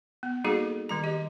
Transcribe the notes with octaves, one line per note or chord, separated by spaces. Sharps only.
B3
G3 A#3 D#4 F#4 G#4 A4
D#3 G3 A#5
G4 D#5